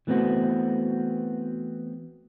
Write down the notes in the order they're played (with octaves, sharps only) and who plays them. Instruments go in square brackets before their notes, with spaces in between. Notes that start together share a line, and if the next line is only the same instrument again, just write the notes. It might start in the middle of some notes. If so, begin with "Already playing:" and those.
[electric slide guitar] E3 A3 B3 C4 F#4